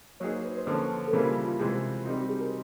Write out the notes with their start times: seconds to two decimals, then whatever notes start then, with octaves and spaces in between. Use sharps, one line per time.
0.20 F#3 A#3 D#4 G#4 C#5
0.33 C5
0.45 B4
0.58 C5
0.67 D3 F3 A#3 C#4
1.08 A4
1.12 C#3 E3 G3 A#3 A#4
1.25 F4
1.47 F4
1.59 C3 E3 G#3 C4
2.05 G3 C4 D#4 F#4
2.17 G4
2.29 G#4
2.41 A#4